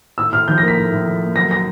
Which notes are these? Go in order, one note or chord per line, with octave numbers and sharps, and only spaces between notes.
A2 E6
A2 F6
F3 G6
A#6
A#3
B6
A2
A2
F3
A#3
F#3 A#6
A#6